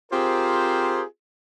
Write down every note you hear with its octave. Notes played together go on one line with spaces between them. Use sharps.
C4 F4 G4 G#4 A#4 C5